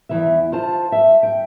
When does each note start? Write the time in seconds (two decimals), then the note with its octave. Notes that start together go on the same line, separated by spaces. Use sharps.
0.09 E2 E3 E5
0.52 F4 C5 A5
0.92 E5
1.23 G5